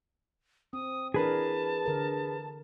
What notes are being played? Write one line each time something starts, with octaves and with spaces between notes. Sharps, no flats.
C4 D#6
E3 D4 G#4 A#4 B4 A5
D3 A#4